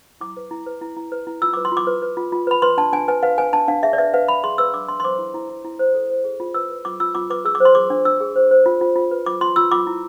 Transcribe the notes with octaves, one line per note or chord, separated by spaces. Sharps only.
E4 D6
B4
E4
B4
E4
E4
B4
E4
F4 E6
B4 D6
C6
F4
D6
B4
B4
F4
F4
B4 B5
B4 C6
D4 A5
D4 G#5
B4 G#5
B4 F5
B4 G#5
D4 A5
D4 F5
G#4 E5
D5
B4 E5
B4 F5
B4 B5
G#4 C6
B4 E6
D4 D6
D4 C6
C6
C5 D6
E4
E4
E4
E4
C5
A4
C5
G#4
F4
B4 E6
B4
F4 D6
F4 E6
F4 D6
B4 D6
G#4 E6
D6
C5
C6
G#4 D6
D4
D4 E6
G#4
C5
C5
F4
F4
F4
B4
F4 D6
F4 C6
F4 E6
F4 D6
E4